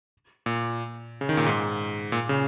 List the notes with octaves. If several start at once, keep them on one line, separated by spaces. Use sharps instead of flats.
A#2
C#3
D#3
A#2
G#2
A#2
C#3